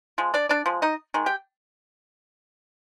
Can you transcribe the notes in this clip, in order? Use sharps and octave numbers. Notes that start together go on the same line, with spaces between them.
F3 G#3
D4 D5
D4 D5
F3 G#3
D#4 D#5
D#3 G#3
G4 G5